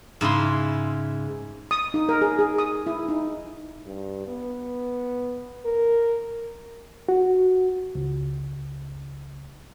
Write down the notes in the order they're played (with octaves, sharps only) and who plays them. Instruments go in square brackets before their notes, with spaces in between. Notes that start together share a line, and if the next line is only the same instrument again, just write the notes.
[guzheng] G#2 C#3 E4 C6
[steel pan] D#6
D#4
A#4
G#4
G#4
D#6
E4
D#4
[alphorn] G2
B3
A#4
[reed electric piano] F#4
C#2